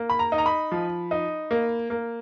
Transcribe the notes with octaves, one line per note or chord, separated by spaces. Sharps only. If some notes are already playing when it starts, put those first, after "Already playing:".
Already playing: A#3
B5
A#5
D#4
A#5
B5
F3
D#4
A#3
A#3